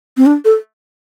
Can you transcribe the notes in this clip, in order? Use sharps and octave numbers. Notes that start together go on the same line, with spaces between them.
C4
D4
A4